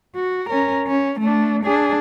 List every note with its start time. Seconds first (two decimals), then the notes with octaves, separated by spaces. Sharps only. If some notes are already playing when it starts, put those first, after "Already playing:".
0.15 F#4
0.49 C#4 A#4
0.87 C#4
1.20 A3 D4
1.64 D4 G#4